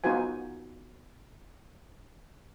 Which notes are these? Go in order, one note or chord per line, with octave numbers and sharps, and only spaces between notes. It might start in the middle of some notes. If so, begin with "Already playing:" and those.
B3 D#4 F4 F#4 C5 G#5